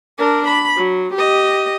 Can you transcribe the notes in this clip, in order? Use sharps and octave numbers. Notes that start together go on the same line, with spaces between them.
D4 A#4
B5
F#3
G4 D#5